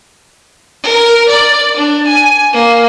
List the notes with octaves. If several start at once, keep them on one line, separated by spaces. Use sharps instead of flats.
A#4
D5
D4
G#5
A#3